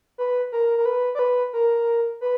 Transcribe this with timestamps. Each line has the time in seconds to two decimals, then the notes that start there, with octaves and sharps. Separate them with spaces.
0.18 B4
0.52 A#4
0.78 A#4
0.85 B4
1.15 D5
1.19 B4
1.53 A#4
2.21 B4